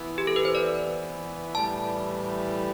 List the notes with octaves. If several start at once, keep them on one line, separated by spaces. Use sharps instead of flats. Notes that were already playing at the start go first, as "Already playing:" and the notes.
Already playing: E3 B3 E4
G4
A4
B4
C5
D5
A2 E3 G3 A5